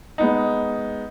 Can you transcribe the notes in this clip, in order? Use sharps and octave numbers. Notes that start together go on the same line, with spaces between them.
G#3 B3 D#4